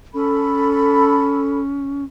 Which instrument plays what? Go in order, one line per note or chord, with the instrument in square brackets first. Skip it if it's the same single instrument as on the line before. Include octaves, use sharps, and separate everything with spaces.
[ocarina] C#4 [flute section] A4 B5